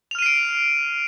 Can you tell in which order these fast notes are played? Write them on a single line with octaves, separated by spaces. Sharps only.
F7 F6 D#7 C7 D7